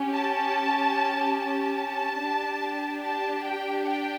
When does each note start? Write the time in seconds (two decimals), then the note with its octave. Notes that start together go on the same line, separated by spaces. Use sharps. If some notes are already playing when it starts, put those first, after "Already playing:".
Already playing: C#4 G4
0.13 A5
1.38 A5
2.19 D4 G4
3.02 A5
3.44 G5
3.86 G5